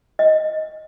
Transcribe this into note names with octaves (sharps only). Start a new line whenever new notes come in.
D#5